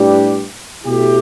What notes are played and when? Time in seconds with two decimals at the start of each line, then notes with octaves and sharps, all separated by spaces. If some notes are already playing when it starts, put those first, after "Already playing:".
Already playing: A2 G3 D4 G4 B4
0.84 B2 A3 E4 G4